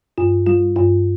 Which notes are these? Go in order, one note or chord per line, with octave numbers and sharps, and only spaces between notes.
G2 F4
G3 F4
G2 F4